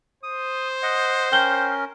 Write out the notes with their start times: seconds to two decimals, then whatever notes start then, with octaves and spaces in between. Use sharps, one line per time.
0.23 C5 D#6
0.82 D#5 F#5
1.32 C#4 A#4 G5 G6 G7